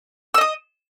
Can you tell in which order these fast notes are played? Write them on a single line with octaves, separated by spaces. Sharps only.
E6 D#5 D#6